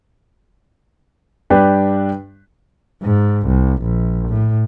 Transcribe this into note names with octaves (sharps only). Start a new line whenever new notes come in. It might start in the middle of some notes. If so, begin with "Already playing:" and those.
G2 D4 G4 B4 G5
G#2
C2
A#1
A2